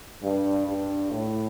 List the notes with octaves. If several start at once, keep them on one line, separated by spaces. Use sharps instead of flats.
G2
G2
A2